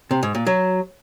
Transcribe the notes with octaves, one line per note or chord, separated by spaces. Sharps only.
C3
G#2
A#2
F#3